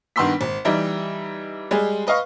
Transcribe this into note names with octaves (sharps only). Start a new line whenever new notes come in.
G2 D#3 B3 C6 E6 B6
G#1
E3 G3 D#4
G3 G#3 G#4
B4 D#5 F5 C#6